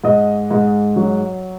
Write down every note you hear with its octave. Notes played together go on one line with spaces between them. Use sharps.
G#2 D#5
G#2
F#3